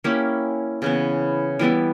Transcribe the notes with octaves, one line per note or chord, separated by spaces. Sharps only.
A#3 C#4 E4 G4
C#3 E3 B3
E3 G3 B3 E4